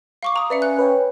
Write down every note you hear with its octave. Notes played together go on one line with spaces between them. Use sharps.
F5 C#6 D6
A#5 D#6
C#4 B4 D5 E5 C#7
F#6
B4 C#5 G5